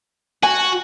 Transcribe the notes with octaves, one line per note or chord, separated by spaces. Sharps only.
F#4 G#5